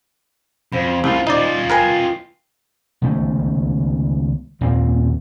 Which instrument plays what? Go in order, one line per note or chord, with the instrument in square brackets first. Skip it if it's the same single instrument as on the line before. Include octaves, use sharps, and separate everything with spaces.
[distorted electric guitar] F2 [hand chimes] C5 F5 B5
[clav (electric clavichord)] C2 [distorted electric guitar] A3 F4
[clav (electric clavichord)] D#4 D5 [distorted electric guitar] F4 D#5
[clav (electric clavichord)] A#4 B4 G#5 [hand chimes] G5 C7
[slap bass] C#2 D#3 A3 B3
D#2 A#2 A#3 C4